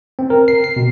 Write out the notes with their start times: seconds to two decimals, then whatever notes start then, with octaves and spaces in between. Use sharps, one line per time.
0.19 C4
0.30 A#4
0.48 C7
0.64 C7
0.76 B2